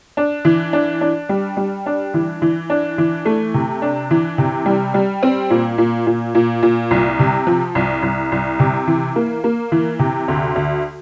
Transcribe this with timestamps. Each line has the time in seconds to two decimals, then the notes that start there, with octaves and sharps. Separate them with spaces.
0.17 D4
0.45 E3
0.73 D4
1.01 D4
1.29 G3
1.57 G3
1.86 D4
2.14 E3
2.42 E3
2.70 D4
2.98 E3
3.25 A3
3.54 C3
3.82 D4
4.11 E3
4.38 C3
4.66 G3
4.94 G3
5.23 C4
5.50 A#2
5.78 A#2
6.07 A#2
6.35 A#2
6.63 A#2
6.91 C2
7.19 C3
7.47 F3
7.75 C2
8.03 C2
8.32 C2
8.59 C3
8.87 E3
9.16 A#3
9.44 A#3
9.72 E3
9.99 C3
10.28 D2
10.56 D2